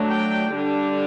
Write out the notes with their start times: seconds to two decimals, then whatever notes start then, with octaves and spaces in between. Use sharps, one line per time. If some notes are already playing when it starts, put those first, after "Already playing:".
Already playing: F#3 A3 D4
0.10 G5
0.53 D3 G3 D4